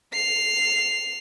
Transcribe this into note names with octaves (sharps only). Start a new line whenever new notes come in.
C7 F7